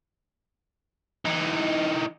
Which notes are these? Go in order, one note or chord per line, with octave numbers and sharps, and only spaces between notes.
E3 D#4